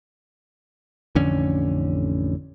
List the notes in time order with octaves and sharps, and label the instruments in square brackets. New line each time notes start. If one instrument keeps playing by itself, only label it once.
[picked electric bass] A1 F2 D3 C#4